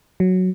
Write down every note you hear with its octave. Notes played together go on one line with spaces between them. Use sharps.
F#3